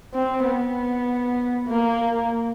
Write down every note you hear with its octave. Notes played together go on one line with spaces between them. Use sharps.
C4
B3
A#3